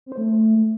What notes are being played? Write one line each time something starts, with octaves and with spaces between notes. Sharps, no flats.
C4
C5
A3